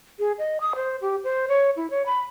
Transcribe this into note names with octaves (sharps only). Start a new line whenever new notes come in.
G#4
D#5
D#6
C5
G4
C5
C#5
E4
C#5
B5